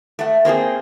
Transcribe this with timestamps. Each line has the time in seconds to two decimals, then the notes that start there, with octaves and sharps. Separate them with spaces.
0.19 A3 F#5
0.45 A#3 C4 F4 G#4